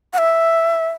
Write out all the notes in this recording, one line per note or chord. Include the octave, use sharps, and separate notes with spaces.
F#5
E5